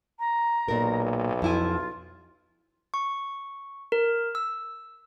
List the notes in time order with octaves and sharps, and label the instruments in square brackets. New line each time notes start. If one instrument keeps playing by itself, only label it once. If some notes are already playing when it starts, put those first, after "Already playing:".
[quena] A#5
[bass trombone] B1 [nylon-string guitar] A#2 A#4
[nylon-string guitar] F2 E4 G#5 [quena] F4
[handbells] C#6
A#4
E6